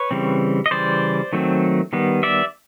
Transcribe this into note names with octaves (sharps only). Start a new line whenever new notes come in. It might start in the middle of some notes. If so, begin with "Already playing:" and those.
Already playing: B4 C#5
C#3 E3 G3 C4
D#5
C#3 E3 G3 C5 D5
D#3 F#3 A3 C4
D#3 G3 B3
D5 E5